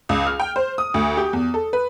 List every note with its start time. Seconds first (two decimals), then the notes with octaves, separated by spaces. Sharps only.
0.09 C#2
0.27 F6
0.40 G5
0.56 C5
0.78 D#6
0.94 D2
1.17 G4
1.33 E2
1.54 A4
1.73 B4